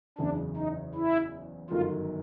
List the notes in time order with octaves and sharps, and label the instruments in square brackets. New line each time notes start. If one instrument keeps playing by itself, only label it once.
[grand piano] F#1 E2 C#3 [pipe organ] D4
[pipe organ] D#4
E4
[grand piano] G1 F#2 D#3 [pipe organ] F4